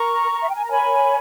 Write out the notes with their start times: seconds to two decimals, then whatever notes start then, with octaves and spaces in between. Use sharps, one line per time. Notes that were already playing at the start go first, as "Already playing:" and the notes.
Already playing: A#4 A#5 C#6
0.30 A#4
0.41 E5
0.48 G5
0.55 G#5
0.62 A#5
0.70 C#5 G#5 B5